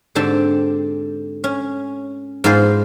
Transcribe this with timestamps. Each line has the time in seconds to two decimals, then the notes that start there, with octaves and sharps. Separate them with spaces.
0.15 G#2 D3 C4 G4 A5
1.44 C#4
2.44 G#2 B3 F4 G#4 C5